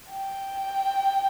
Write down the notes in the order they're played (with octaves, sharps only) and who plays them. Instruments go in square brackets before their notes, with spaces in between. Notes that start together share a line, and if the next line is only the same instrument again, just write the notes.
[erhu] G5